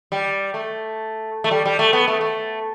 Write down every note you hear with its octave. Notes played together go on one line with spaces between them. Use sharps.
G3
A3
A3
G3
G3
A3
B3
A3
A3